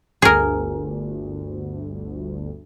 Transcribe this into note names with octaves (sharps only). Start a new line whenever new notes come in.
G1 D2 G#4 A#4